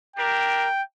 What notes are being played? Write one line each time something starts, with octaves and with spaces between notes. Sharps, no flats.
D4 G4 A#4 G5